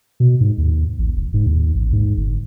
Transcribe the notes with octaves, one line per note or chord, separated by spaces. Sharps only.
B2
G#2
D#2
A1
E1
G#2
D#2
A1
G#2
G1